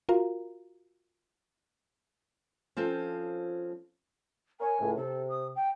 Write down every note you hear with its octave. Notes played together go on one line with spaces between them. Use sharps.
F4 F#4 A#4 F5 A#5
F3 C4 C#4 F4 A4
A#4 C#5 G#5
C#2 A2
C3 A4
D#6
G5